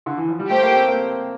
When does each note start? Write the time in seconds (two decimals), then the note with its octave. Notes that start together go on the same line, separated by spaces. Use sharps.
0.06 D3
0.17 E3
0.28 F3
0.39 G3
0.50 A3 G4 C5 G5
0.62 A#3
0.74 C4
0.88 A#3